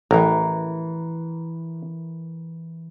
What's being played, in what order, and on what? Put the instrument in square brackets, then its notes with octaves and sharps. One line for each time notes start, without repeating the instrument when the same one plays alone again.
[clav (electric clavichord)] A1 [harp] E3 A#4